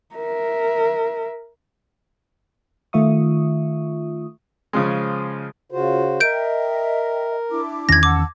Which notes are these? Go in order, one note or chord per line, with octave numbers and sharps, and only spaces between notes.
A#4 E5
D#3 A3 F4 E5 C#6 D#6
C#3 F3 G#3
C#3 F4 F#4 C5
A#4 D#5 E5 G5 G6 D7
D4 E4 D6
E2 D#3 C#4 G#6 A#6
F#5 A5 D6 E6